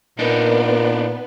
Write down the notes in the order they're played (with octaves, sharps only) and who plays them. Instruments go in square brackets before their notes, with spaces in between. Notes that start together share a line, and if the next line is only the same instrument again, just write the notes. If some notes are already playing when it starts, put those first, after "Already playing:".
[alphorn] A#2 [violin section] B3 [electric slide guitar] D4 D#4 [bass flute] A#4